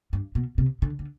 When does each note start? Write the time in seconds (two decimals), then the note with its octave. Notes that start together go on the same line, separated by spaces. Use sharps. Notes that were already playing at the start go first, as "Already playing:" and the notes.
0.13 G2
0.35 B2
0.58 C3
0.82 D3
0.99 D3